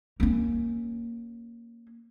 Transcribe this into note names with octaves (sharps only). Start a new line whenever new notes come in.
A#3 C#4